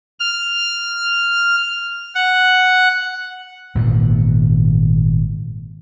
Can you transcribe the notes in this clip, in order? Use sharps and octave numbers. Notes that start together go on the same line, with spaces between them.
F6
F#5
G#1 A#2 D#3 E3